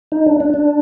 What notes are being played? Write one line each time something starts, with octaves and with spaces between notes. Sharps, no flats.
D#4
D4
D4
D4